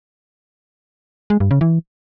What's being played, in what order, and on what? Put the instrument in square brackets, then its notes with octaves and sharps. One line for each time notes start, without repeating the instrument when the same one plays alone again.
[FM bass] G#3
G2
C#3
E3